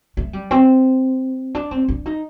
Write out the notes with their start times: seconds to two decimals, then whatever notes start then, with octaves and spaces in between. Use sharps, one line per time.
0.17 A3
0.33 G3
0.51 C4
1.55 D4
1.71 C4
1.88 D4
2.06 D#4